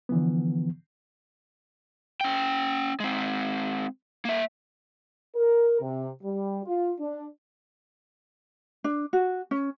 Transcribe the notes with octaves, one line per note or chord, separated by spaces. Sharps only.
D3 E3 F3 B3
C#4 G5
G#3 C4
A#3 E5
A#4
C3
G3
F4
D4
D4
F#4
C#4